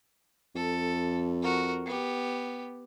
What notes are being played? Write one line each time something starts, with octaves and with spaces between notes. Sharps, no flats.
F2 A4
F#4 A#4
B3 G4